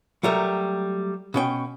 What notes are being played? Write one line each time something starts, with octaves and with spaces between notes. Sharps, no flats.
F#3 G3 A3 A#4
B2 C#4 G5